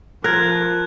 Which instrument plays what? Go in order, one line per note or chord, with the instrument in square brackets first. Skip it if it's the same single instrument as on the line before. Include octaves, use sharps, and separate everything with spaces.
[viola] F3 [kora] A#4 [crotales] F#6 G#6